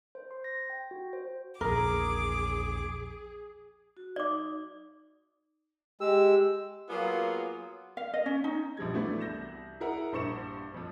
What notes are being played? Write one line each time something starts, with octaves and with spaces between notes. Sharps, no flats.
C5
C6
A#6
G5
F#4
C5
A#1 E2 G#4 A#4 D6
F#4
D#4 D5 D6
G#3 G4 E6
F#3 A#3 B3 F4 G#4
F5
D#5
C#4
D#4
A#1 F3 G3 G#6
E3 F#3 A3 B3 D4 E4
C2 G6 A#6 E7
E4 G#4 A#4 E5 F#5
A#1 G2 C5 C#6 C#7 E7
F2 F3